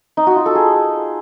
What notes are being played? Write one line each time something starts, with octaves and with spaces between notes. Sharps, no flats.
D#4
F#4
F4
A4
G#4